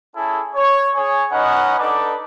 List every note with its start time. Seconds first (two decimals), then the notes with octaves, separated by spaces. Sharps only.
0.16 C#4 E4 G#4 A4
0.55 C#5
0.95 G#4 C#5
1.32 C#4 D#4 B4 D#5 F#5
1.79 D4 D#4 A4 B4 D6